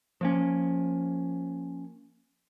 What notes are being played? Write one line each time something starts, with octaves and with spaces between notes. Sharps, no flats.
F3 A#3 C#4